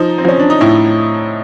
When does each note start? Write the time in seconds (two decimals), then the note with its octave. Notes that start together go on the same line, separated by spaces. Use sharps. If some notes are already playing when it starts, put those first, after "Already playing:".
Already playing: F3 D#4
0.18 C4
0.25 F3 C#4
0.39 D4
0.50 D#4
0.60 A2 E4